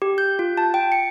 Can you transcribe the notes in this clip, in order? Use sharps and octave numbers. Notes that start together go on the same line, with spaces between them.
G4
G6
F4
A5
G5
C#7